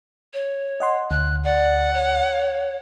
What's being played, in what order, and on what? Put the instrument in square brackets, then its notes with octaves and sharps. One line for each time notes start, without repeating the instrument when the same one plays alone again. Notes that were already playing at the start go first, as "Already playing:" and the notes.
[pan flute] C#5
[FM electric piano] D#5 F#5 C6
[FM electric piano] D2 [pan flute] F#6
[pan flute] D5 [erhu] F#5
[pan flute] C#5